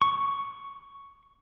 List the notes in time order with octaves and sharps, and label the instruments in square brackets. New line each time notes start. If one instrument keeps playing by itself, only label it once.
[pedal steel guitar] C#6